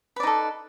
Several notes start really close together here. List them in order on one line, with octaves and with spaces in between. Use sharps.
B4 D5 D#4 A4